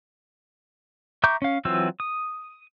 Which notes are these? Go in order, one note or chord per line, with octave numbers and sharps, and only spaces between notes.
E5 A#5 C#6 D6 G6
C#4 F5
E3 F#3 C4 F4 E6
D#6